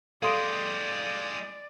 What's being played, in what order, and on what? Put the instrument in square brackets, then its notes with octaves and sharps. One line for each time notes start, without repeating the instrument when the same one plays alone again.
[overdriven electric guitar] G#3 G4 [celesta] A4 C6 D7 [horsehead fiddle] D5 [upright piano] F5 D#6